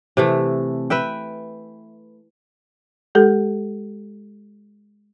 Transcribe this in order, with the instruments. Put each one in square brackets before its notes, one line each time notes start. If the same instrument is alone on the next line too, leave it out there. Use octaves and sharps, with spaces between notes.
[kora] C3 E3 A3
B4 E5 G5
[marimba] G#3 G4 A4